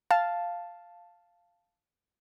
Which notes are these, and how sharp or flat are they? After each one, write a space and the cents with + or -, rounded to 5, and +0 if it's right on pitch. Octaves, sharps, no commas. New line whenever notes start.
F5 +0 A5 +0